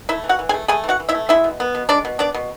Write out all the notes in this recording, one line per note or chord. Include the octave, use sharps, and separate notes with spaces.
A3 E4 E5
E3
F#4 F#5
E3
G#4 G#5
A3
A3 G#4 G#5
E3
F#4 F#5
E3
E4 E5
A3
G#3 E4 E5
B2
B3
B2
G#3 D4 D5
B2
B3 D4 D5
B2